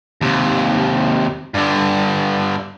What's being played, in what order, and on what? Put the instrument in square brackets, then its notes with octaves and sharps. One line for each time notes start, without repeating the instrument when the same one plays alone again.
[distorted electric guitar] D#2 C3
G2 D3